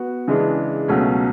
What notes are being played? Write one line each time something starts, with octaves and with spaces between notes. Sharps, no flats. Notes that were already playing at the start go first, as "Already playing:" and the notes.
Already playing: B3 F#4
C#3 E3 G#3 D4
C#2 B2 F#3 A3 C#4